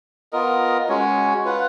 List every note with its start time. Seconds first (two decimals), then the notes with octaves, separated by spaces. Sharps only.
0.33 B3 F4 A#4 D#5
0.89 G#3 C#4 F#4 C#5
1.45 F4 B4 F#5